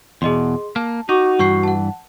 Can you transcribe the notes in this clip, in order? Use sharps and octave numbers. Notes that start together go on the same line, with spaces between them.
E2 B2 G#4 D#5 C6
A#3 A5
D#4 F#4 F#5 C#6 D6
G2 E3 C#6 G6 C7
F#5 A5